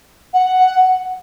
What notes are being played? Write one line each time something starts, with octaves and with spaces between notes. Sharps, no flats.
F#5